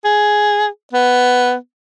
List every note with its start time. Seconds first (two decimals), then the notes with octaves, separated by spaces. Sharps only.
0.05 G#4
0.93 B3